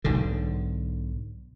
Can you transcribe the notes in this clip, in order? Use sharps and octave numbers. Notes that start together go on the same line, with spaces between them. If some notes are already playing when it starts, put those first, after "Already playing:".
B1 G#2 D3